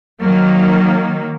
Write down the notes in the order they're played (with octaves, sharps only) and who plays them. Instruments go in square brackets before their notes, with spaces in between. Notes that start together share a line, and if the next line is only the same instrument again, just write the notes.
[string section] D#3 F#3 A#3